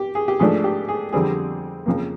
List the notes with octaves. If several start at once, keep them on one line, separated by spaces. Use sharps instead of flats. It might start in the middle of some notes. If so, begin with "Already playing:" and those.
Already playing: G4
G#4
G4
G#2 F3 A3 D4 G#4
G4
G#4
F2 D3 G3 C4 G#4
F2 C#3 F3 A#3